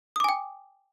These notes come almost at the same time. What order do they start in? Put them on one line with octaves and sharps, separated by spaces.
D#6 D6 G#5 G5